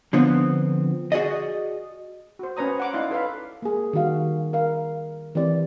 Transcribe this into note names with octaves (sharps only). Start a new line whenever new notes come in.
D3 F3 B3 C4
F#4 G#4 D5 D#5
F#4 C5
C#4 B4 C#5 A#5 D#6
F#5 D6
D#4 E4 D5 F5 C6
A4 B4 C#5 F5 B5
A#3 G#4
D#3 G3 F#4 F5
A#4 F5
E3 C4 G4 D5